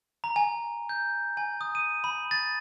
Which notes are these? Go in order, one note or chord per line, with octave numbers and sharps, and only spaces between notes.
A#5
G#5
G6
G#5
D#6
D#7
B5
A6